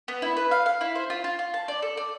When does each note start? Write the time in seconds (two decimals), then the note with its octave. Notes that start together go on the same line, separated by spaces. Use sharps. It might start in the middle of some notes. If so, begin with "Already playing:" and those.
0.08 B3
0.22 E4
0.37 B4
0.51 F5
0.66 F5
0.81 E4
0.95 C5
1.10 F4
1.24 F4
1.39 F4
1.54 A5
1.68 D5
1.82 A4
1.97 D5